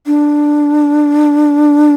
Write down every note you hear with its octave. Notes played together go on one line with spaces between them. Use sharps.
D4